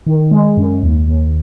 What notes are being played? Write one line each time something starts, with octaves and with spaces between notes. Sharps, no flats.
D#3
G#3
F#2
D#2
D#2